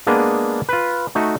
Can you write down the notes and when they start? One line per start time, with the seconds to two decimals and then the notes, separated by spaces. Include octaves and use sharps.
0.07 G#3 A#3 B3 D4 G#4
0.69 F4 B4
1.15 A3 D#4 F#4